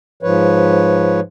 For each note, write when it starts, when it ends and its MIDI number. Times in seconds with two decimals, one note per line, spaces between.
0.23 1.20 44
0.23 1.20 53
0.23 1.20 71
0.23 1.20 73